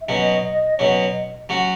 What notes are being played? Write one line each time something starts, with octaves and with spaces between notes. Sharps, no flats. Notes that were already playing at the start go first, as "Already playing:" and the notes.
E5
B2 F#3 C#4 D#5
D#5
B2 F#3 C#4 C#5
D#5
F#3 C#4 F#4